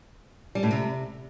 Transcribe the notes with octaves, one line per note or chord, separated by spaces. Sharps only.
G3
A2
C3